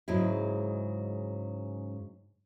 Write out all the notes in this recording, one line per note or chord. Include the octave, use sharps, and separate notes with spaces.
G#2 C#3 F#3 G#3 E4